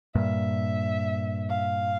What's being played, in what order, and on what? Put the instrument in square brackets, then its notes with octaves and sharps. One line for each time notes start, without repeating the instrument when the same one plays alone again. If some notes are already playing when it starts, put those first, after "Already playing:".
[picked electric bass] G2 A#2 [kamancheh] E5
[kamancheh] F5